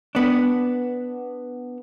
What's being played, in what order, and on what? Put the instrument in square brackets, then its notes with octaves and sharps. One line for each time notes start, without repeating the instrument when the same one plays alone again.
[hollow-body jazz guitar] B3 D4